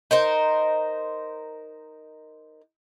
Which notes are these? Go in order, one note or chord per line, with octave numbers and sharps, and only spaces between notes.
D#4 A#4 C5